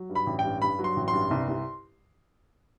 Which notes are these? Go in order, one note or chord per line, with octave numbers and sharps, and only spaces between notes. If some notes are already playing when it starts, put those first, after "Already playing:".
Already playing: F#3
G2
B5
A1
G5
G2
G2 B5
F#3
C6
A1
C6
G2
C2
C2